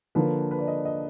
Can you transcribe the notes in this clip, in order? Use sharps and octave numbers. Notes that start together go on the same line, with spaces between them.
D3 F3 A#3 B4
B4
D5
D#5
D#5